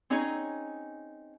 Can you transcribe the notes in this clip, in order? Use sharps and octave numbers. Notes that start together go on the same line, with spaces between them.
C4 C#4 D#4 G#4 C#5 A#5